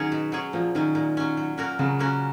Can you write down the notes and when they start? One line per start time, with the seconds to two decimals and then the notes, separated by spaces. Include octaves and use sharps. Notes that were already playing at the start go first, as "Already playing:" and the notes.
Already playing: D#3 F#3 C#4 G#4 C#5
0.12 B2
0.32 F#3 C#4 G#4 C#5
0.53 A#2 F3
0.75 D#3 F#3 C#4
0.95 A#2
1.17 F#3 C#4
1.37 F#3
1.58 A#3 C#4 F#4 A#4
1.79 C#3 F#3
1.99 A#3 C#4 F#4 A#4